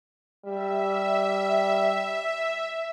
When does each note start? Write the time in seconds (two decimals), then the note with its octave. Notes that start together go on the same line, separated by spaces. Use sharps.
0.45 G3 E5